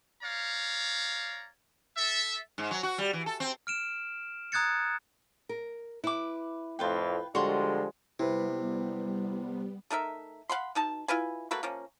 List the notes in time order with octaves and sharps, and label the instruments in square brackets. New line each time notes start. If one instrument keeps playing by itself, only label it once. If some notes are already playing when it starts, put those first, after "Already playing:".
[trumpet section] C#5 D5 F5 A#5
A4 E5
[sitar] G#2
F#3
F#4
G3
E3
A4
C4
[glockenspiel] F6 D7 E7
A#5 D#6 F#6 G#6 A6 C#7
[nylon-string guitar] A#4
[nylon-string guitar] E4 [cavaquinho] B4 D6
[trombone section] F2 A2 [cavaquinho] F4 B4 G5
[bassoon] D3 [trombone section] F3 G3 G#3 [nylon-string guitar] F#4 [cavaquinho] C#5 C6
[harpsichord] C3 [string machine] G3 B3 [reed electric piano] E4 B4
[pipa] A3 D#4 A#4 E5
F5 F#5 B5 C6
B2 D#4 A5
E4 F4 B4 G#5
A3 A#3 F#4 B4
F3 A#3 C#4